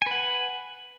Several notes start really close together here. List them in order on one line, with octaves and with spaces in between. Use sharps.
G#5 B4 F#5